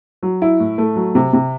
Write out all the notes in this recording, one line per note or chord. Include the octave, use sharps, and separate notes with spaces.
F#3
E4
A2
A3
F#3
C3
C3